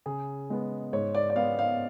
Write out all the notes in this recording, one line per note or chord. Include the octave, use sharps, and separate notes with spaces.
C#3 G#4
G#3 B3
G#2 C#5
D5
D5
G#3 B3 F5
F5